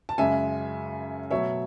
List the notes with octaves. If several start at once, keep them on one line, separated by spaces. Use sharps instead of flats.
A5
F#2 C#3 G#3 E5 G#5
B2 F#3 A3 C#5 E5